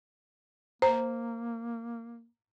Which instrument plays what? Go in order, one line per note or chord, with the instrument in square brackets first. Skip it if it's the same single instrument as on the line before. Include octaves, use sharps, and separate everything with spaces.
[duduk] A#3 [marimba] C5 [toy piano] A#5